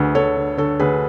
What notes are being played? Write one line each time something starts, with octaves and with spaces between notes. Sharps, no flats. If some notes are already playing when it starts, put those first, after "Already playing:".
Already playing: D2 D3 G#4 B4
D2 A4 C#5
D3
D3 A4 C#5
D2 G#4 B4